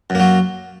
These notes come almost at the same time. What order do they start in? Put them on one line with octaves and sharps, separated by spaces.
F#2 A#3 F#3